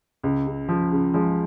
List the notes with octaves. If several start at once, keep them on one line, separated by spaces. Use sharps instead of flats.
C#2
C#3
F3
C#3
F3 G#3